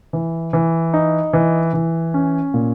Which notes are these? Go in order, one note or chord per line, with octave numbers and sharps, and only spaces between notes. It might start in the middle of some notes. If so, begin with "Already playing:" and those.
E3
E3
D#4
E3
E3
C#4
A#2